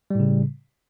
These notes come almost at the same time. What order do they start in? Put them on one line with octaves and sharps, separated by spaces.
G3 A2 C#3